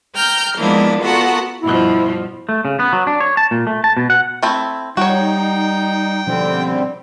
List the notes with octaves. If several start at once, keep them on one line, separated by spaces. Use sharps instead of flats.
G5 A#5 F6 G6
F3 G#3 A#3 B3 D4 E4
B3 F4 F#4 A4 A#4 F#5
G2 B2 F3 E4
A3
C#3
B3
F#3
D4
C#5
A5
A#2
A3
A5
B2
F#5
A3 C4 E4
G3 D#4 F#4 C#5 G5
B2 D3 F3 G3 C4 C#4